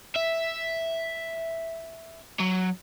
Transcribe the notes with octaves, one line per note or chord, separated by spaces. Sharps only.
E5
F#3